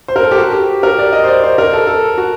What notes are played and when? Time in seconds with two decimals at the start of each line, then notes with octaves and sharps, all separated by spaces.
0.08 C5
0.16 A#4
0.23 A4
0.31 G4
0.38 F#4
0.53 G4
0.83 A#4
0.99 D5
1.13 D#5
1.24 C5
1.28 D5
1.43 C5
1.58 A#4
1.73 A4
1.87 A4
2.18 F#4